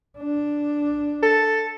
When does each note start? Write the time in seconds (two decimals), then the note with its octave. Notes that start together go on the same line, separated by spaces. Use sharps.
0.18 D4
1.23 A4